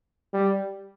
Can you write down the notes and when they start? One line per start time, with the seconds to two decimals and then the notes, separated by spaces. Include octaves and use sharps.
0.34 G3